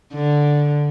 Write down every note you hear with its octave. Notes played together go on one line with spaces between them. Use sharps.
D3